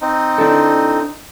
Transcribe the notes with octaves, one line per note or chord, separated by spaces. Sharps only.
C4 D#4
D4 E4 A4